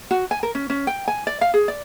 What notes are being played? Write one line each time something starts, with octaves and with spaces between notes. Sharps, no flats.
F#4
G#5
A#4
C#4
C#4
G5
G#5
D5
F5
G#4
D5